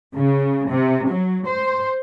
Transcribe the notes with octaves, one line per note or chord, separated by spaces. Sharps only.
C#3
C3
F#3
C5